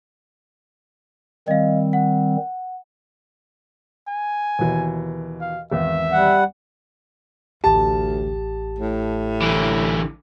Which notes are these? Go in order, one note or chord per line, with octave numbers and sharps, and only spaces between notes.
D#3 G3 C4 D#5 F5
F#5
G#5
D#2 B2 E3
F5
G#1 E2 E5
G3 F#5
A1 D2 G4 A5
A2
D3 E3